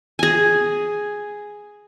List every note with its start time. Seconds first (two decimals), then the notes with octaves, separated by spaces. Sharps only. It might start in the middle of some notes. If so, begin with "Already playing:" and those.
0.19 G#4 G#5